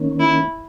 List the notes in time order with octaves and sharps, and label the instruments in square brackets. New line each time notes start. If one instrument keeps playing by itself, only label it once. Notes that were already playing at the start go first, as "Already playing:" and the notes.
Already playing: [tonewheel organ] D#3 A#3 C#4
[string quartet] E4